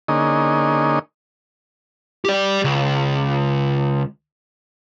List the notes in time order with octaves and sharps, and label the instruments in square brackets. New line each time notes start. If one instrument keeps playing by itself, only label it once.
[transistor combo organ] D3 A#3 C#4 D#4 G#4 D#5
[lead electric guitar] G4 D5
C#2